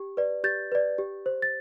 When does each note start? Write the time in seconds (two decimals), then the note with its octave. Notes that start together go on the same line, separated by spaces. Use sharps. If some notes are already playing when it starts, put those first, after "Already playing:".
Already playing: G4
0.17 B4 D5
0.44 G4 G6 A6
0.72 B4 D5
0.98 G4
1.26 C5
1.42 A6